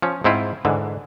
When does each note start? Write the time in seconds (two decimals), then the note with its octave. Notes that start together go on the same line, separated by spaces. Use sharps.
0.02 F3 C#4
0.24 G#2 C4 E4 F4
0.65 G#2 D3 E3